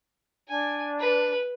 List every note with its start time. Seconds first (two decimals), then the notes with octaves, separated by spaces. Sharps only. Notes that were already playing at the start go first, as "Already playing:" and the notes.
0.49 D4 G#5
0.99 B4